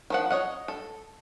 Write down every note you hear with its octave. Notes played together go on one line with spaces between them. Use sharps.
D#3 F3 F#5
C#5 D#5 F#5
A4